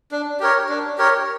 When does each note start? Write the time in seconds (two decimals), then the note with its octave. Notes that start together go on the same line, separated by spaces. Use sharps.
0.12 D4
0.40 G4 A#4 C#5
0.69 D4
0.98 G4 A#4 C#5